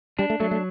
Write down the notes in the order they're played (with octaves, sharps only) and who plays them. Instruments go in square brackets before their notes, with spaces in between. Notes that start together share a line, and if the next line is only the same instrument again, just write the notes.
[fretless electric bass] G3 [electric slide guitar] D4
[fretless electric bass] A3
[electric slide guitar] F#3 [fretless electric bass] A3
[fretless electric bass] A3